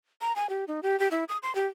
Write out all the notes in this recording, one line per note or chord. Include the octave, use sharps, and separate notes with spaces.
A#5
G#5
G4
D#4
G4
G4
E4
D#6
C6
G4